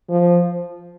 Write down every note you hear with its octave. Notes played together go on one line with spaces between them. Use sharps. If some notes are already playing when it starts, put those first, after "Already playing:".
F3